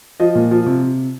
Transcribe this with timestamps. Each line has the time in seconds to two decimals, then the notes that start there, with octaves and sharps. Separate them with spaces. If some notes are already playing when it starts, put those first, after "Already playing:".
0.20 F3 D#5
0.35 A#2
0.51 F3
0.66 C3